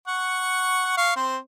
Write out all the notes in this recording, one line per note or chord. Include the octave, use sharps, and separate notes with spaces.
F#5 C#6
F5 C#6
C4 C5